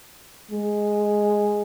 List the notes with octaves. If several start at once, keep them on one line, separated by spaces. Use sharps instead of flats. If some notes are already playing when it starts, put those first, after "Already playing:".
G#3